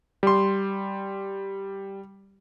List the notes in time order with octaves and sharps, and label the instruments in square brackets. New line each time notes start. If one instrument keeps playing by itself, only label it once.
[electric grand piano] G3 C6